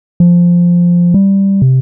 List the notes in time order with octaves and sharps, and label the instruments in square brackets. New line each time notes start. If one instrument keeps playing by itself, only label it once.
[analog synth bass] F3
G3
C3